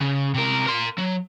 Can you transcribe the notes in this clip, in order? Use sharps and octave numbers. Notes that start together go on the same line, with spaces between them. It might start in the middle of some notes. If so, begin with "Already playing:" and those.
C#3
C3 A#4
A#4 C6
F#3